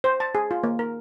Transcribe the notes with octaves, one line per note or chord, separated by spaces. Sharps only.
C5
A5
G#4
F4
A#3
A#4